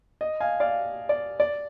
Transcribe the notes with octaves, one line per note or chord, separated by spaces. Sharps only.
D#5
F5 G#5
D5 F5
D5
D5